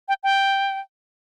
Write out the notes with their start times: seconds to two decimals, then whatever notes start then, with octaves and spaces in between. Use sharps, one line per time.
0.08 G5
0.23 G5